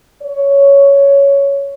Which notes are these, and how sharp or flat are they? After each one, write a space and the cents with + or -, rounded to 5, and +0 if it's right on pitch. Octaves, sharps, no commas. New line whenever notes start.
C#5 +10